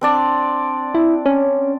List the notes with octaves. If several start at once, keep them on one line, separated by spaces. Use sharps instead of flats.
C4 D4 D5
E4
C#4